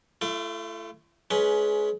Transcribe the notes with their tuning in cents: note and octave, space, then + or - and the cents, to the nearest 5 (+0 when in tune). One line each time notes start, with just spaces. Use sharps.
A3 +0 F4 -45
G#3 +25 C#4 +15 B4 +0